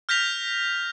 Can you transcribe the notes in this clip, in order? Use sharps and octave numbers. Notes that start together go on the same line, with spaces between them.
F6 G6 A#6 B6 F7